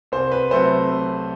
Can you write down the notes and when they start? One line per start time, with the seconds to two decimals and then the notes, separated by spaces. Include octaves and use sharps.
0.12 C2 C5
0.32 B4
0.51 C3 F#3 A3 C5